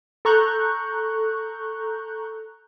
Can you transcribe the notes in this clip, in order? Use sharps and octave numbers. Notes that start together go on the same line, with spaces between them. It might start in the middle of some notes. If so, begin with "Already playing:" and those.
A4 A#5 C#6 F#6 G6